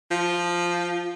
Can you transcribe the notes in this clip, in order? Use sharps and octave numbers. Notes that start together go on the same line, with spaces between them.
F3